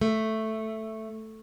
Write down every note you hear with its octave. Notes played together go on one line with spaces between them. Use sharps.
A3